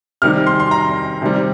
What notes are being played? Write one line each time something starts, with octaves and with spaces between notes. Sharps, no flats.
C3 D#3 G3 F6
C6
C6
A#5
C3 D#3 G3